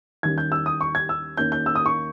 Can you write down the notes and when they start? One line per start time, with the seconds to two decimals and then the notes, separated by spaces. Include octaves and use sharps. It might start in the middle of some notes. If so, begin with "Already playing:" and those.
0.23 D#2 D#3 G3 C#4 G#6
0.38 G6
0.52 E6
0.66 D#6
0.81 C#6
0.95 G#6
1.09 E6
1.37 D#2 D#3 A#3 C#4 G6
1.52 G6
1.66 E6
1.75 D#6
1.86 C#6